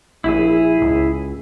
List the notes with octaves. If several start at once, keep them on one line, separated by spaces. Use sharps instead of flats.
A#1 E4 G#4
C#2